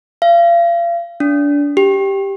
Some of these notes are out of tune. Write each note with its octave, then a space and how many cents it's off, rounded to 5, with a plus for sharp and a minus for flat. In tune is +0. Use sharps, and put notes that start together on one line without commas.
F5 -35
D4 -25
G4 +0